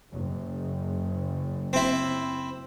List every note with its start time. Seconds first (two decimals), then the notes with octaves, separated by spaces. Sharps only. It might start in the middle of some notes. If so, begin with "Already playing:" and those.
0.13 F#1
1.73 C4 E4